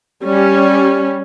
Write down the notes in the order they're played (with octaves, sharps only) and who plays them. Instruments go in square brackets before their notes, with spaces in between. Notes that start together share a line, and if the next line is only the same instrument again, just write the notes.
[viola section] G3 C#4